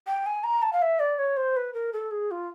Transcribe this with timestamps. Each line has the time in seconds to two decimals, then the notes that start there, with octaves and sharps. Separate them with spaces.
0.07 G5
0.26 G#5
0.44 A#5
0.62 A5
0.73 F5
0.82 E5
1.00 D5
1.19 C#5
1.37 C5
1.57 B4
1.74 A#4
1.93 A4
2.11 G#4
2.31 F4